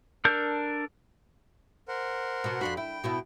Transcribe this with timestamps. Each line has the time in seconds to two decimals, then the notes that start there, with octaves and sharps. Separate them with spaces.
0.25 D4 A4 A#4 G6
1.88 A#4 C5 F#5
2.44 B2 B3 F#4
2.61 F2 D4 F#4 B5 C6 F#6
2.77 E4 G5
3.04 B2 B3 E4